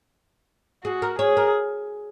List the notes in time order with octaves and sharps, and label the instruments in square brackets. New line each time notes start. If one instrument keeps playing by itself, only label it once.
[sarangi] F#4 [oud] G#4
[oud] A#4
[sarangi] G#4 [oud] C#5
[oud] A#4